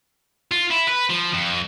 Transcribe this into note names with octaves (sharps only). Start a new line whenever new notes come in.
F4
E4
B4
F3
F2